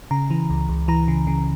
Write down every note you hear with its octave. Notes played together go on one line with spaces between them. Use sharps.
C#3 A#5
E3
C#2
C#2
E3 A#5
C#3
C#3